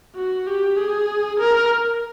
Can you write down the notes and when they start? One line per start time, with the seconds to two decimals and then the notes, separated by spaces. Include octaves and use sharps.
0.15 F#4
0.47 G4
0.77 G#4
1.39 A#4